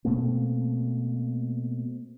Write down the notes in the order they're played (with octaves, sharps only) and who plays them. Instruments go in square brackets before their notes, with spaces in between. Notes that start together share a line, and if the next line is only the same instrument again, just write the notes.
[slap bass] B2 A3 A#3 C4